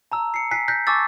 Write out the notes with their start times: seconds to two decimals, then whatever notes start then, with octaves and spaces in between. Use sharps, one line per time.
0.12 A5 A#5 E6
0.34 C7 C#7
0.51 G#5 F#6 B6 C7
0.68 F#6 G6 A#6 B6
0.87 G#5 A5 C#6 D6 E6 A6